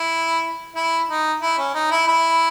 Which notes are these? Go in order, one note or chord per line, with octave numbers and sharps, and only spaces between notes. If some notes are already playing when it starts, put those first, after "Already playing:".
Already playing: E4
E4
D#4
E4
C#4
D#4
E4
E4